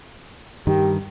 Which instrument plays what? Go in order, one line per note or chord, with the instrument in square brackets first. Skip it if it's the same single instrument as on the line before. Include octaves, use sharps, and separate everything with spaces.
[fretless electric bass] G2 D#3 [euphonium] G4